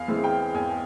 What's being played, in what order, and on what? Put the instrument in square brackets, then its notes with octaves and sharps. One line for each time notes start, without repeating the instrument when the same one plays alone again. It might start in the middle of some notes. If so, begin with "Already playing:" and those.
Already playing: [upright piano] E2 F5
E3 G#3 C4
G5
E2 G#5